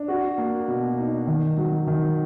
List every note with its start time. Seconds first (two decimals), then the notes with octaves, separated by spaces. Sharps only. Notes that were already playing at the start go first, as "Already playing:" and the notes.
Already playing: D4
0.08 F#4
0.38 A#3
0.68 B2
0.98 D#4
1.27 D#3
1.57 F#3
1.87 D#3